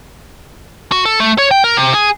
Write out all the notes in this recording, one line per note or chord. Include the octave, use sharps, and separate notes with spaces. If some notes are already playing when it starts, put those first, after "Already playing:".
F#4
A4
A3
C#5
G5
A#4
C3
G#4